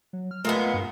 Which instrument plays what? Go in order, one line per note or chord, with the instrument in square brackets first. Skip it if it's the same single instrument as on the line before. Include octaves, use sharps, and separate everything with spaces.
[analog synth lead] F#3
F6
[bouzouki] A#2 G#3 B3 [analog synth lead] A3
[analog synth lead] G2